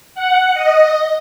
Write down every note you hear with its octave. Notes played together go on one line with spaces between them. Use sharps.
F#5
D#5